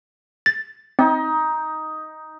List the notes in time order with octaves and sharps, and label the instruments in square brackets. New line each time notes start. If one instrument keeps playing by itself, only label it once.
[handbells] A6
[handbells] C4 [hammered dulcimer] D#4